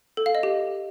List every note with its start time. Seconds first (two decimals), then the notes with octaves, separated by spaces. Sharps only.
0.17 A4
0.26 F5
0.35 D#5
0.43 G4